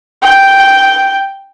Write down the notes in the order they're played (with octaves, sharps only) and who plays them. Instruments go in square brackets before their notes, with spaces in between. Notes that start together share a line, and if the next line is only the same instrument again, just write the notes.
[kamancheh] G5